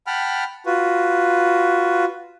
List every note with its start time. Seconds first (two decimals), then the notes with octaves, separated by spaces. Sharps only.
0.07 F#5 G5 A5 B5 F6
0.66 F4 F#4 B4